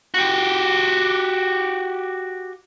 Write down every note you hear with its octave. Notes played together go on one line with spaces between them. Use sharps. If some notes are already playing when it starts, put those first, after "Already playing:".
F#4 G4